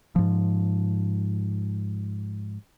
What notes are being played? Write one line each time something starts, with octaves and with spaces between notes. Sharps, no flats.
G#2 F3